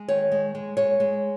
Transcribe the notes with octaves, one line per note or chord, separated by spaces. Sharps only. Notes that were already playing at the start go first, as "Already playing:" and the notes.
Already playing: G#3
D#3 C#5
G#3
G#3
G#3 C#5
G#3